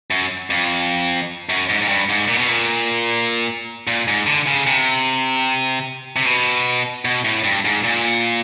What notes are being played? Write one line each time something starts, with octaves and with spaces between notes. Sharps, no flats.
F#2
F2
F#2
G#2
G#2
G2
G#2
A#2
B2
A#2
A#2
G#2
D3
C#3
C3
C3
B2
B2
A2
G2
G#2
A#2